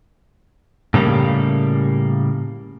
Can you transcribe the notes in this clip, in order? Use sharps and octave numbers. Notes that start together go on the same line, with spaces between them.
A2 C#3 G3 A#3